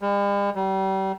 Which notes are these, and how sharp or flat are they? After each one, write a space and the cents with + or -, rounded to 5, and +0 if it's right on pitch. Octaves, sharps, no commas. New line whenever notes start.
G3 +45
G3 -35